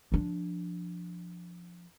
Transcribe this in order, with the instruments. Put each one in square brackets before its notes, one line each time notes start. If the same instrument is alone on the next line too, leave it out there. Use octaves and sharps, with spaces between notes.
[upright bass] F3 D4